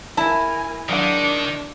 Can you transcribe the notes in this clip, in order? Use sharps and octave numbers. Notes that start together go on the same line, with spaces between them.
E4 A#4 G#5 A5
D#3 F#3 G#3 D4 F#5